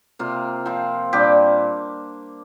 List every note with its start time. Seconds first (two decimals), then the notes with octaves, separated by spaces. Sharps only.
0.19 C3 A#3 F4
0.66 F3 C4 F4
1.13 A#2 G3 D4 G4